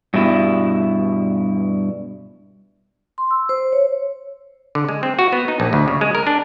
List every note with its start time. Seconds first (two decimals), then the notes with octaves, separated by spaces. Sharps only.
0.14 G2 B2 E4
3.18 C6
3.31 E6
3.49 C5
3.73 C#5
4.75 D3
4.89 G#3
5.03 C4
5.19 F#4
5.32 B3
5.48 D#4
5.60 A#1
5.73 D2
5.88 C#3
6.01 G#3
6.15 A#4
6.27 D4